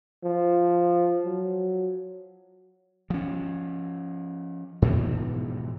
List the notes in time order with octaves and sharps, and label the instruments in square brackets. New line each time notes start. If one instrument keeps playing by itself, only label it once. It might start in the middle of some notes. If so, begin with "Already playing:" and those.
[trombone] F3
F#3
[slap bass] F3 C#4
G#2 B2 E3 F3